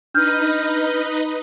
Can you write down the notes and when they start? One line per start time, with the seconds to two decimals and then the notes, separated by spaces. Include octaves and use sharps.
0.14 D4 D#4 B4 D#5 F6 G6